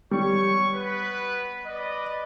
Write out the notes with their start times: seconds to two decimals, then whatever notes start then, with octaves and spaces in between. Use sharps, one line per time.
0.11 G3 C#5 C#6
0.73 B3 B4
1.66 B4 D5 D#5